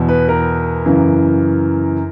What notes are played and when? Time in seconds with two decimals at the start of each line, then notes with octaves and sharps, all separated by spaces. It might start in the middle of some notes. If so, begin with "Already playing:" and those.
Already playing: E2 B2
0.09 B4
0.28 A#4
0.86 F#2 C#3 E3